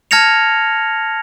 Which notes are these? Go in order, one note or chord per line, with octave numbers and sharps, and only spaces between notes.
A5 F6 G#6 A#6 C#7 F7